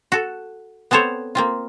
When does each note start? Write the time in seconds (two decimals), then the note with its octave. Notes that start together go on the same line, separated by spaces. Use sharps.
0.12 F#4 A4
0.91 B3 C4 A4 C5 C#5
1.35 A#3 C4 F4